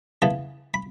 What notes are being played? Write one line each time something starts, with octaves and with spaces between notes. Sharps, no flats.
C#3 E3 B3 A5
B5